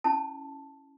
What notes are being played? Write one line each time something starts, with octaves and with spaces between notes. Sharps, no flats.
C#4 E4 A5